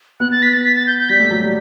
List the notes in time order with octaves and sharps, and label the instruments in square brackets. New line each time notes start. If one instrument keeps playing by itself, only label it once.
[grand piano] B3 [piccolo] F#6
[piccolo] A6
B6
A6
B6
A6
G6
G6
[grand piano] G3 [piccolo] B6
[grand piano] A3
F#3
G3